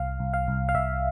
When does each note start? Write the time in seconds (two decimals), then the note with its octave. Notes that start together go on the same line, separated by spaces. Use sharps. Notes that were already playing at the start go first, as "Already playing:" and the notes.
Already playing: C2 F5
0.20 C2
0.34 F5
0.48 C2
0.69 F5
0.75 C2 E5